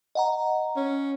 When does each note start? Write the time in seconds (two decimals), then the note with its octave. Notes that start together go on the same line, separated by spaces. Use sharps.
0.15 D#5 F#5 A#5
0.76 C#4